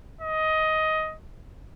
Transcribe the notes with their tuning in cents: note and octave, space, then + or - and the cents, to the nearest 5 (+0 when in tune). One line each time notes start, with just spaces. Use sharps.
D#5 +15